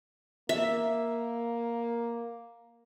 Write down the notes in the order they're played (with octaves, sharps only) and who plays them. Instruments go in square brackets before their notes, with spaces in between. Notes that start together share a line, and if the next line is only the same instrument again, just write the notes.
[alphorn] A#3 [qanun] E5